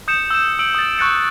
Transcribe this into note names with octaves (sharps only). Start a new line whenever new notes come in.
D#6 G6 C#7 E7
E6 E7
E6 D7 F#7
D#6 A6
C#6 F#6 A6 C#7